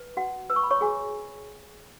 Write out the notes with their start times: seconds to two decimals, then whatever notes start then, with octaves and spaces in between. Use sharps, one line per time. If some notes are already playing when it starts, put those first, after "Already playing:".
Already playing: B4
0.17 F#4 F#5
0.50 B4 E6
0.56 C#6
0.63 B5
0.71 C#5 C#6
0.81 F#4 G#4 G#5